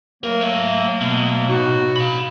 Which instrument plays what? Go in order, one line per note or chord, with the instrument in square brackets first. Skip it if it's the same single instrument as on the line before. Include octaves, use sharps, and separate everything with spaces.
[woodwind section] F#3 A3 A#3 [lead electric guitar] A#4
[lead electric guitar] C#5 E5
B2
[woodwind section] A2 D#4 F#4
[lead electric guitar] F5 B5